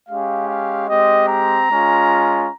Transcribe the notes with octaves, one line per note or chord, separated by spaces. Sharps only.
G#3 C#4 G4 F5
F5
G#3 C4 G4 D#5
A#5
G#3 C#4 F4